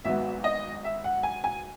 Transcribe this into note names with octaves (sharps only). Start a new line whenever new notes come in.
G#1 G#2 F#3 B3 E5
D#5
E5
F#5
G#5
G#5